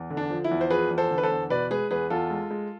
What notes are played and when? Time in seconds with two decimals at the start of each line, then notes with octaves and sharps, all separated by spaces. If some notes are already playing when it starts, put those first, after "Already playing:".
Already playing: E2
0.10 D3
0.17 D4
0.30 F3
0.44 E4
0.51 E2
0.61 C5
0.70 F3 G#4 B4
0.91 E2
0.98 A4 C5
1.11 D3
1.18 B4
1.23 A4 C5
1.31 E2
1.50 B2 B4 D5
1.71 G#3 G#4 B4
1.91 E2 G#4 B4
2.10 E2 F4 A4
2.30 G#3
2.51 G#3